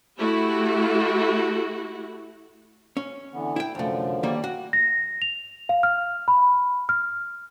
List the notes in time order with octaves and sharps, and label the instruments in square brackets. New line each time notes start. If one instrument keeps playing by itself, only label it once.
[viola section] A3 E4 F#4 G4
[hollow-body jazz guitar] C#4
[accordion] D3 E3 B3
[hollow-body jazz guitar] E4 G5
[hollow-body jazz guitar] C2 A3 [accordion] F#2 D3 F3
[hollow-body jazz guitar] D#3 G3 A#3
F#4
[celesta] A#6
F7
F5
F6
B5
F6